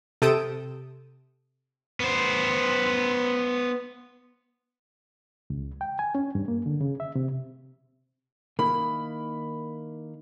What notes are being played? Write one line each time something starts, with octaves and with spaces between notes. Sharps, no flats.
C3 A4 D#6 G6 D7 E7
B3 C5
C#2
G5
G#5
C#4
G2
A#3
D3
C#3
E5
C3
D#3 A#3 E4 B5